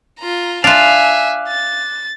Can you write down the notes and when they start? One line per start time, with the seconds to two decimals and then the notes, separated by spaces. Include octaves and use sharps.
0.19 F4 A#5
0.64 D4 F4 E5 F5 G#5 D6 F#6
1.48 A6